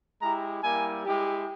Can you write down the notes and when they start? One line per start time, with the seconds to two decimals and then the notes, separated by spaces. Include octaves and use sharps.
0.21 G#3 E4 G4 A#5
0.63 G3 A#3 E4 G#5
1.04 G#3 E4 G4